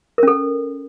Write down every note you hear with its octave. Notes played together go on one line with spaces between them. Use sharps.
C#4 A4 A#4